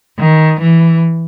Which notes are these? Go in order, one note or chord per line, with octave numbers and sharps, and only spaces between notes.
D#3
E3